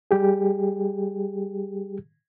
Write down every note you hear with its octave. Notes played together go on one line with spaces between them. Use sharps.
G3 G4 G#4